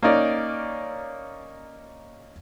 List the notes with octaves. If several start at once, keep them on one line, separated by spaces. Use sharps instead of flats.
A#3 C#4 D#4 D5